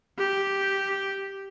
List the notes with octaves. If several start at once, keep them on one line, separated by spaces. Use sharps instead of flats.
G4